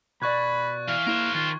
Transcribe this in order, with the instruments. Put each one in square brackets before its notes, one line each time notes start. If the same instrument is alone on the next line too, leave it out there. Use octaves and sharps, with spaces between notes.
[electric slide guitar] B2 D5 [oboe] B5 [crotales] C#6 F#6 G#6
[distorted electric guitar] E3 [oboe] F5
[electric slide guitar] A#3 E4 [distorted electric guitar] A#4 C5
[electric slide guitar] D#3 [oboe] F4